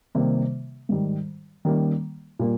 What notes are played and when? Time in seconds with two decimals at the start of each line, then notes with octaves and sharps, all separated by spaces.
0.15 C3 D#3 G3 A#3
0.89 G#2 D#3 G3
1.65 D#3 G3 A#3 C#4
2.39 A#2 G3 A#3